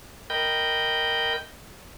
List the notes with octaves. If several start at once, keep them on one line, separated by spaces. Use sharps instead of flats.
A#4 D#5 G5 B5 G6